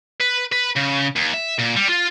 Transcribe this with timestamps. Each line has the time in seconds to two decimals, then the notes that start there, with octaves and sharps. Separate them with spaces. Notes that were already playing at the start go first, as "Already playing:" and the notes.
0.21 B4
0.52 B4
0.76 C#3
1.16 D#2
1.33 E5
1.58 A#2
1.76 G3
1.89 F4